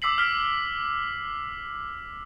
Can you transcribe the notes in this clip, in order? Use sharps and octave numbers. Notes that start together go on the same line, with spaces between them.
D6 E6 B6 C7 F#7
F6 B6